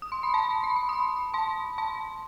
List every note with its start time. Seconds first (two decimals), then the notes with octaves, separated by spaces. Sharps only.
0.02 D#6
0.12 C6
0.23 B5
0.34 A5 C6
0.64 B5
0.76 C6
0.89 B5 D#6
1.34 A5 C6
1.78 A5 C6